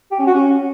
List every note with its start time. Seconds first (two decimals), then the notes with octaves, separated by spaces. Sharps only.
0.11 G4
0.19 C#4
0.27 F#4
0.35 C#4